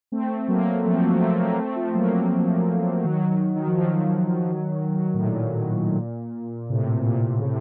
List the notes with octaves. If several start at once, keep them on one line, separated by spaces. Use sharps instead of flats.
A3 C4
F#3 A#3
F3 A3
C4
F#3 A#3
A3 C4
F#3 A#3
A3 C4
F3 A3
F#3 A#3
D#3 F#3
D#3
F3
D#3 F#3
A2
A#2
A2 C3
A#2
C#3
A2 C3